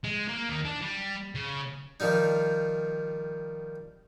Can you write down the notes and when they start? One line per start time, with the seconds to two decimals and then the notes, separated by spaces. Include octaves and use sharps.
0.04 G#3
0.28 A#3
0.49 D#3
0.65 D4
0.82 G3
1.35 C#3
2.00 D#3 F3 G3 D#4